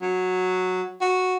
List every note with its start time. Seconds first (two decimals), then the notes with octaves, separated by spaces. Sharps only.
0.02 F#3
1.01 F#4